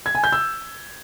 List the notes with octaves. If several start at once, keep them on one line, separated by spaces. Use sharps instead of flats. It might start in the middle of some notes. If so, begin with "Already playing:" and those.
G#6
G#5
G6
E6